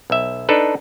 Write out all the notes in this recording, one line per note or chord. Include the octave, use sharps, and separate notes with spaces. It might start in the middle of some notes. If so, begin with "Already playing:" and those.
B1 E5
D4 D#4 A4 B4